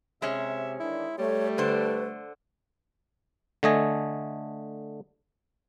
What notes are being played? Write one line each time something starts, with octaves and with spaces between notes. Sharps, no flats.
C3 G#3 C#4 E5
D#3 E3 D4 E4
G3 A3 C#5
D3 B4 C5
D3 A3 D#5 G#5